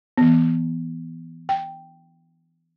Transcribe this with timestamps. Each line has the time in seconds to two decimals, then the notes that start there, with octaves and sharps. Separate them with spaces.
0.17 E3 B3
1.49 G5